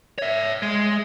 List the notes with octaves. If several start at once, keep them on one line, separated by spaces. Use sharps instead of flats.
C#5 E5
G#3